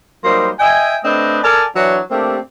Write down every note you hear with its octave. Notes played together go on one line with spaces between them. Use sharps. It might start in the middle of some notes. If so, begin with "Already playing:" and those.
F#3 G3 A#3 D#4 C5 C6
D#5 E5 G5 G#5
A3 C4 D4 B4 D#5
A4 A#4 D5 G#5 A5
E3 F#3 D4
A3 A#3 C4 D4 G4